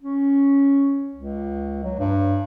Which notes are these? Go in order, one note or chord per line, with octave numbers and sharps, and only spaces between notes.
C#4
C#2
F#3
G2